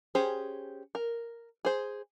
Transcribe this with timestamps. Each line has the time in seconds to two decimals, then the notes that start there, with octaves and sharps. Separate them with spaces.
0.15 C#4 G4 G#4 C5
0.95 A#4
1.65 G#4 C5